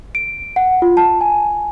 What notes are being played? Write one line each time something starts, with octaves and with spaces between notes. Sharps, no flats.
D7
F#5
F4
A5
G#5